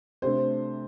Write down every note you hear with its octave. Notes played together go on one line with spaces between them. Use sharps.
C3 A3 D4 C5